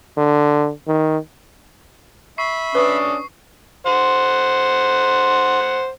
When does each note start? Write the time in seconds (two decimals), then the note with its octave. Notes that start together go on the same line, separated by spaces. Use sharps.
0.17 D3
0.87 D#3
2.38 E5 B5 C#6 C7
2.75 C#4 D4 B4 D#6
3.86 C5 F#5